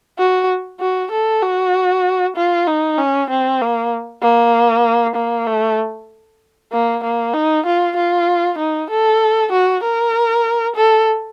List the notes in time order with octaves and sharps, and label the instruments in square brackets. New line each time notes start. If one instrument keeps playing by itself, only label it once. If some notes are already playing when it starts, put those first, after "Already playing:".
[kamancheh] F#4
F#4
A4
F#4
F4
D#4
C#4
C4
A#3
A#3
A#3
A3
A#3
A#3
D#4
F4
F4
D#4
A4
F#4
A#4
A4